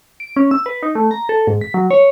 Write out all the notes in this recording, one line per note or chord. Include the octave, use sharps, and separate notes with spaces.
D7
C#4
E6
B4
D#4
A3
A#5
A4
G#2
B6
F#3
C#5